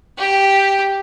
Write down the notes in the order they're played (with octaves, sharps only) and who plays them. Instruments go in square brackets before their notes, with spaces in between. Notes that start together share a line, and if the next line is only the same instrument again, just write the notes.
[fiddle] G4